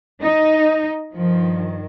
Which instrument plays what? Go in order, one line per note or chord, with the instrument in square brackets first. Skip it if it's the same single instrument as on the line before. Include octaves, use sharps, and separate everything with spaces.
[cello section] D#4
G2 D#3 F3